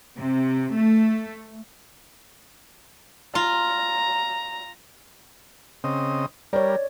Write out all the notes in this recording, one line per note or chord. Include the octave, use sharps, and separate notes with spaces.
C3
A3
F4 A#5
C#3 C4 D#5
G3 A#4 C#5 D5